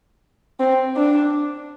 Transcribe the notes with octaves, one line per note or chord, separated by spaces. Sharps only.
C4
D4